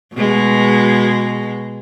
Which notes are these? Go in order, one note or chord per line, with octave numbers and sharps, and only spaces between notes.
B2 G#3